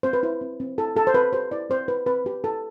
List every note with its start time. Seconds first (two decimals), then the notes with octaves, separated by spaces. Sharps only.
0.03 C4 C5
0.13 B4
0.23 E4 C5
0.41 C4
0.60 C4
0.78 E4 A4
0.96 G4 A4
1.07 C5
1.14 C4 B4
1.33 G4 C5
1.51 E4 D5
1.70 C4 C5
1.88 E4 B4
2.06 C4 B4
2.25 C4 G4
2.44 E4 A4